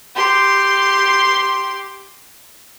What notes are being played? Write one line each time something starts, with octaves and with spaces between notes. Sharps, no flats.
G4 C6